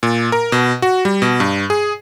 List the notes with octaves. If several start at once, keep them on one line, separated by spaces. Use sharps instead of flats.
A#2
A#4
B2
F#4
G3
B2
G2
G#4